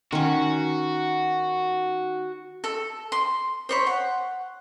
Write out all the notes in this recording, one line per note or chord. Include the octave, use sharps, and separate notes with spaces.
D#3 C#4 F#4
A4
C6
C5 C#5 B5
F#5